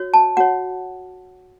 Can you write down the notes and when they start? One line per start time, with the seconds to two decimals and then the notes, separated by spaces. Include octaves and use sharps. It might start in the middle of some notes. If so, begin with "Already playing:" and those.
Already playing: F#4 C#5
0.14 A5
0.37 F#4 C#5 F#5